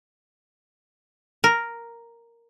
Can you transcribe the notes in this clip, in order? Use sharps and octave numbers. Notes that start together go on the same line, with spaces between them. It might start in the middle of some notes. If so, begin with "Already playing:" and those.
A#4